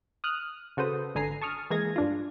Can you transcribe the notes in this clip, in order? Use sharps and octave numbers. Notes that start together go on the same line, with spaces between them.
D#6 F6 F#6
C#3 F#4 A4 B4 C5 D#6
G#1 D3 G#5 A#5 C7
A5 C#6 D#6 F6
E3 G#3 A#3 G#4 G#6 A#6
G2 D4 F4